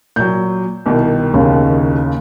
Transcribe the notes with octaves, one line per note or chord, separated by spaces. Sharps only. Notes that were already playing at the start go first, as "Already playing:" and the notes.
A#2 F#3 G6
C2 B2 D#3
D#2 C#3